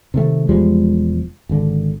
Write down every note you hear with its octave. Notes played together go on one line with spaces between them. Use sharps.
C3 D#3 A3
E1 F3 G3 G#3
G#1 D3